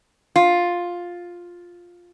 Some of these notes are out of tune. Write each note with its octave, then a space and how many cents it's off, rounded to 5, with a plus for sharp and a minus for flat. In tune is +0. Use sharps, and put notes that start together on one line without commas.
F4 +5